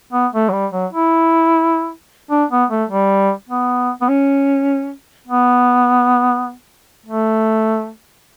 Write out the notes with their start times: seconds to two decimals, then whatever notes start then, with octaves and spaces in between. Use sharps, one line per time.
0.13 B3
0.33 A3
0.49 F#3
0.53 G3
0.72 F#3
0.93 E4
2.30 D4
2.51 B3
2.70 A3
2.90 G3
3.49 B3
4.01 B3
4.08 C#4
5.28 B3
7.06 A3